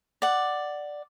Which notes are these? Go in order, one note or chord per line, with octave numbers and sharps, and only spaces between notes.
D5 F#5